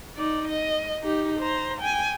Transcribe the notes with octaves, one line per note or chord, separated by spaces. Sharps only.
D#4 D5
D#5
D#4 G4
C5 A#5
G5 G#5